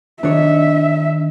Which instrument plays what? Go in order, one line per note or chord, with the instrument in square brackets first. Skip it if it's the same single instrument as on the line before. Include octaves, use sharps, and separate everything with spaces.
[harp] D#3 [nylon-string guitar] D4 C#5 [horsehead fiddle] E5